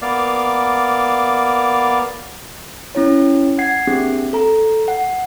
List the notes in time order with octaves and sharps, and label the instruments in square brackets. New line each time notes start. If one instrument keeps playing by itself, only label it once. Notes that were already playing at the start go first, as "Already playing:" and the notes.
[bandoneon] A#3 B3 D5 F5
[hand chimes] C#4 E4 C#5
F#5 G#6 C7
A#3 C4 D4 G4 G#4
A4 A#5
F#5